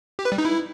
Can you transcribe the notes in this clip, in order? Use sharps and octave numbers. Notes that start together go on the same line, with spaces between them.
G4
B4
G3
D#4
E4